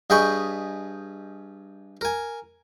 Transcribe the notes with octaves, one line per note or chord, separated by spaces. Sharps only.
G2 G#4 D#5 G5 B5 C#6
A#4 G#5